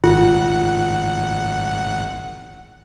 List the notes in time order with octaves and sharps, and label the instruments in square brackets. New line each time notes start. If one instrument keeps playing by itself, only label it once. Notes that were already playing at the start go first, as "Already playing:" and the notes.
[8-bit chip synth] G#1 F#5 [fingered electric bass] D#3 [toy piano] F4